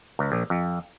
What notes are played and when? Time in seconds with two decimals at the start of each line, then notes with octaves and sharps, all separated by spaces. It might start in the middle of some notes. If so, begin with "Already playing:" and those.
0.19 C#2
0.32 A#1
0.50 F2